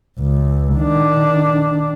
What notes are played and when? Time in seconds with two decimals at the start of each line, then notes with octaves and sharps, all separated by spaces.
0.20 C#2
0.75 D#3 D4